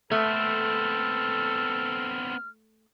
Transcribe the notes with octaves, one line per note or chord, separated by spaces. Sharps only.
A3 B3 C4 A4 F6